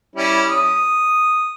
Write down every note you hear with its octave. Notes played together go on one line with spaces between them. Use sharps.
G3 C#4 E4
D#6